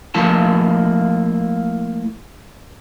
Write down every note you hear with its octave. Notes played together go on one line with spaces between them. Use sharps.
F3 A3 A#3 E4 A5